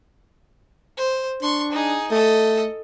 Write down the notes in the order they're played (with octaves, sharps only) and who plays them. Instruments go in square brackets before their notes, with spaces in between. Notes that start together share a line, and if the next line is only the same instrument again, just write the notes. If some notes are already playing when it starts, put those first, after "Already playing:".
[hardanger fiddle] C5
[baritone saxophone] D4 [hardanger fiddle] C6 C#6
[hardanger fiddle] D#4 G#4
[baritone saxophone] A3 [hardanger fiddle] A4 D#5